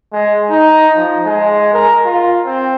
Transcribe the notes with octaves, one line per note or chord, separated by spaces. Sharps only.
G#3
D#4
F3
G#3
A#4
F4
C4